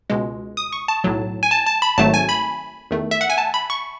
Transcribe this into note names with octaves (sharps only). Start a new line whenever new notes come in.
C#2 B2 G#3
D#6
C#6
A5
B1 A2 F#3
G#5
A5
A5
B5
G#1 G#2 F#3 A3 A5
G#5
B5
E2 D#3 A3
E5
F#5
G#5
A5
B5
C#6